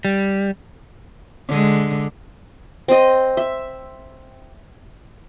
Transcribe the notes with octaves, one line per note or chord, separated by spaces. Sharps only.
G3
D3 G#3
C4 D#5
E5